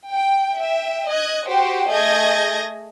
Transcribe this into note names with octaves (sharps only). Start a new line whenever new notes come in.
G5
E5 G5
D#5 F#6 G#6
F#4 G4 C5 G5
A3 G#4 D#5 G6 G#6 A#6